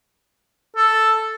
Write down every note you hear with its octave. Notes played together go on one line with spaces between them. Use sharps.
A4